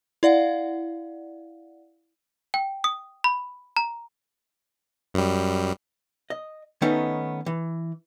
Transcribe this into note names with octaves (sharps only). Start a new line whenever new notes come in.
E4 D5 F5 F#5
G5
D#6
B5
A#5
F#2 G3
D#5
D#3 A3 B3 C#4 D#4
E3